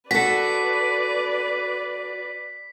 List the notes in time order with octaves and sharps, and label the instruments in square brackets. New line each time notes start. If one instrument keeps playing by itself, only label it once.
[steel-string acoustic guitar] F#4 A4 [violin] B4 D5 [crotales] B6